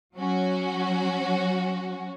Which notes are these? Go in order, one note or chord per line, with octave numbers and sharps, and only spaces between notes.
F#3 C#4 F#4